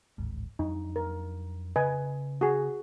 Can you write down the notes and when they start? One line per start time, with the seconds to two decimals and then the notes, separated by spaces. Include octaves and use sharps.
0.18 D1 G#1 G#2
0.59 F2 F#3 D4 D#4
0.96 A#4
1.76 C#3 B4 D#5 G#5
2.41 F#4 G#4